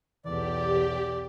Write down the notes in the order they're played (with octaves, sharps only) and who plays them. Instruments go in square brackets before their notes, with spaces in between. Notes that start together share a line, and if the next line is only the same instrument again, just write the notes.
[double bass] B1 E2 [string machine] G4 [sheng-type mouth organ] D5